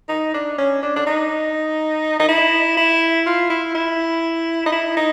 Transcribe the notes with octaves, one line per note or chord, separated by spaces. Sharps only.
D#4
D4
C#4
D4
D4
D#4
D#4
E4
E4
F4
E4
E4
D#4
E4
D#4